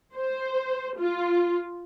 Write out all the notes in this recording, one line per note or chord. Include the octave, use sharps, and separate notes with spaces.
C5
F4